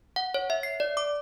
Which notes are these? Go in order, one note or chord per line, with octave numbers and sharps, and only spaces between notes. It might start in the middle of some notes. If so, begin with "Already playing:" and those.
F#5
C#5
E5
C7
D5
D6